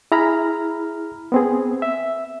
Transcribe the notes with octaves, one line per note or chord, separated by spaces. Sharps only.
E4 G#4 A#5 B5 F6
B3 C4 G#4
E5